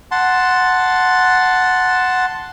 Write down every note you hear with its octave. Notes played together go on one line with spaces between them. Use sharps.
F#5 A5 C6